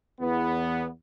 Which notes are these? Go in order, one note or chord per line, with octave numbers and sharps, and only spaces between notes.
E2 B3